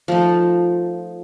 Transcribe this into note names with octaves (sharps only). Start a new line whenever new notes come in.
F3 A3 D#4